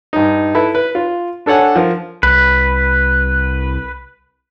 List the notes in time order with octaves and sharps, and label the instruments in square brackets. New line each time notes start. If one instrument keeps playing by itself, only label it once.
[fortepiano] G2 D#4
E4 A4 B4
B4
F4
D4 A4 C#5 F#5 G#5
F3 A#4
[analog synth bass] C2 [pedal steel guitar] B4